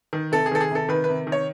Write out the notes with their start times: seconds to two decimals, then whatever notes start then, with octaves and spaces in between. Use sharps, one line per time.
0.13 D#3
0.32 C3 A4
0.46 G#4
0.51 D#3 A4
0.61 G#4
0.71 C3 A4
0.89 D#3 B4
1.04 C3 B4
1.27 D#3
1.32 C#5